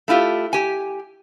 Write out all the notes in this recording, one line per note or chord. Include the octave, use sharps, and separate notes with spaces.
A3 E4 F4 G4
G4 G#5